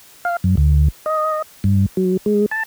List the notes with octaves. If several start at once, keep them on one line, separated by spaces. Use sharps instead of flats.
F5
F#2
D2
D#5
G2
F#3
G#3
A5